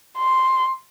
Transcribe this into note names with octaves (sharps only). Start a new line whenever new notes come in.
C6